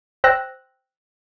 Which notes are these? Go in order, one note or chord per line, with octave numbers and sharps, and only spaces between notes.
C5 G5 E6 F#6 A#6